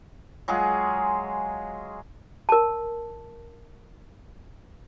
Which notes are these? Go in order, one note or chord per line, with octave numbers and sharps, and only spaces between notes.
F#3 G#3 F4 G#4
A#4 A5